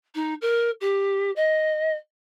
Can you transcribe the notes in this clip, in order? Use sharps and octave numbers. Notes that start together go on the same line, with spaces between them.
D#4
A#4
G4
D#5